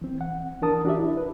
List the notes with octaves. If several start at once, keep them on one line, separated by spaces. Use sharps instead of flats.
E3 C4
F#5
E3 D4 A#4 A5 D#6
D4 F#4 G4 D5 E5
E4
B4